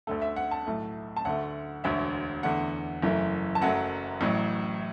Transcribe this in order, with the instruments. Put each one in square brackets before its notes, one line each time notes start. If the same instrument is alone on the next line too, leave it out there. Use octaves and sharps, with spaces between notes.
[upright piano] D2 D3 A3 A4
E5
F#5
A5
B1 A2 A3
A5
D2 D3 A3 F#5
E1 D2 D3 E5
E2 D3 A3 F#5
F#1 F#2 E3 A3
A5
F#1 F#2 F#3 A3 F#5
A1 A2 F#3